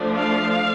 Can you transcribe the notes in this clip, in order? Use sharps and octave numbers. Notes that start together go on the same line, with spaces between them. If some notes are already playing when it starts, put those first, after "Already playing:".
Already playing: F3 A3 D4
F5